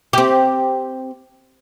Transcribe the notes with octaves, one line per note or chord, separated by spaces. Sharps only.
C4 G4